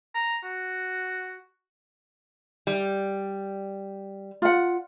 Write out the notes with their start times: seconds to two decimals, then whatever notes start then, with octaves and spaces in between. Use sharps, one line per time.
0.15 A#5
0.43 F#4
2.67 G3
4.42 F4 F#5